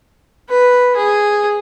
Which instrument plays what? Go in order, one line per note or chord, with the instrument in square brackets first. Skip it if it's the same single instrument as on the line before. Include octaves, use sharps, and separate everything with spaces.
[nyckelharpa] B4
G#4